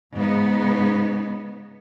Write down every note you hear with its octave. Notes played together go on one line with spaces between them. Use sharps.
G#2 C#3 B3 D#4